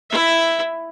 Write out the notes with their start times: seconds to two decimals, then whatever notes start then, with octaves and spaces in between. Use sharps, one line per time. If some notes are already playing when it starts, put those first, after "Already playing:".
0.10 E4 E5